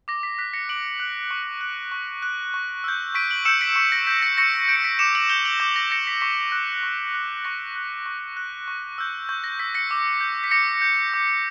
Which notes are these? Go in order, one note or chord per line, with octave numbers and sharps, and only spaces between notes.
D6 A#6
B6
F#6 B6
A#6 C#7
D6 D7 F#7
F#6
C#6
F#6
C#6
F#6
C#6
E6 G6
C#6 B6 D7
D7 F#7
E6 G6 C#7 E7
B6 D7
C#6 B6
A#6
G6 B6
A#6 C#7
C#6 A#6 C#7
G6 D7
C#7
B6 D7
D6 C#7 E7
D7 F#7
G6 E7 G7
D7 F#7
D6 G6
A#6
G6 A#6 C#7
B6
C#6 B6
F#6
C#6
F#6
C#6 A#6
F#6
C#6
F#6
C#6
E6 G6
C#6 G6
A#6
E6 G6 B6
A#6 C#7
D6
G6
B6
D6 A#6 C#7
G6
D6